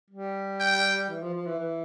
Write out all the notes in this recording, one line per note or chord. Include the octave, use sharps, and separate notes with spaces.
G3
G5
E3
F3
F3
E3
E3